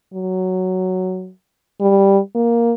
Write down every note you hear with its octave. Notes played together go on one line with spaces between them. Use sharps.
F#3
G3
A#3